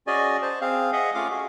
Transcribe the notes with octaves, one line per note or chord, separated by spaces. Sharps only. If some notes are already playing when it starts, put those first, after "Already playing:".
C#4 F#4 G#4 D5 D#5 G#5
C5 A5
C4 G#4 F5
G#4 D#5 E5 F#5
A3 C#4 F4 F5 D6
F#4 G#4